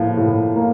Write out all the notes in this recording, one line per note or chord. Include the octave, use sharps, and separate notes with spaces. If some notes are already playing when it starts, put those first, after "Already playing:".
Already playing: A2 F3 A#3
A2
A#3